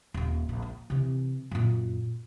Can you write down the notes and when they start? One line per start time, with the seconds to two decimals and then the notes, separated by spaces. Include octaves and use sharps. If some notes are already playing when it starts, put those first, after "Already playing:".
0.14 D#1 A#3
0.49 A#1
0.62 A#3
0.90 C3 E3
1.51 F#2 A#2